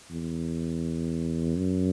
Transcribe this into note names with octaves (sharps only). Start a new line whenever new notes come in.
E2
F#2